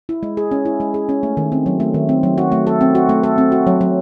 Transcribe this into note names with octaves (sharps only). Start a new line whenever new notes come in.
E4
G#3
G#4
C#4
E4
G#3
G#4
C#4
A3
D#3
C4
F#3
A3
D#3
C4
F#3
F#4
A3
A4
C4
F#4
A3
A4
C4
F#4
F#3
F#3